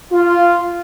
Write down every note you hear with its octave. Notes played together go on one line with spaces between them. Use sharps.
F4